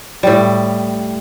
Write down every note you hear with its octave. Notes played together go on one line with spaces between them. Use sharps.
A2 G3